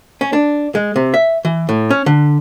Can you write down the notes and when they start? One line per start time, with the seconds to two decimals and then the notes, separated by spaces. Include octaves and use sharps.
0.21 C#4
0.33 D4
0.75 G#3
0.96 C3
1.14 E5
1.45 E3
1.69 A2
1.90 C#4
2.06 D3